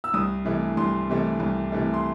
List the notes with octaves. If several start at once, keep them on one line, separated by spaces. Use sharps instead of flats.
E6
C2 D#6
C3 E3 A3
C2 C6
C3 E3 A3
C2
C3 E3 A3
C6